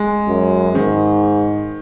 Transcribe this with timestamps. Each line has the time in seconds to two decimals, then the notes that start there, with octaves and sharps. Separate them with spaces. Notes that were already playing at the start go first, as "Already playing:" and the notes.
Already playing: G#3
0.28 F#2
0.75 G#2 D#3